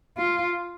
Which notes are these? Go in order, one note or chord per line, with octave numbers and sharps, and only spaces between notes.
F4